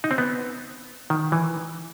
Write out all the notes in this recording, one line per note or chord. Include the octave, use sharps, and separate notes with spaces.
D#4
C4
B3
D#3
E3